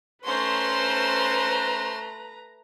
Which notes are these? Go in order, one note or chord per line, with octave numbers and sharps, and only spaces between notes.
A3 C#4 B4 C5 A#5 C6